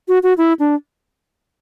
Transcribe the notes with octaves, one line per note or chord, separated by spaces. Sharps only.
F#4
F#4
E4
D4